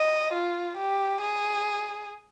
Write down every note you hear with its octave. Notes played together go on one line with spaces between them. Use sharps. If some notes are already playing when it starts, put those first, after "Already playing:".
Already playing: D#5
F4
G4
G#4